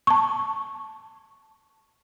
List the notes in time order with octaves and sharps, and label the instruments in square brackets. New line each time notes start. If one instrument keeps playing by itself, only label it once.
[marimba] A5 C#6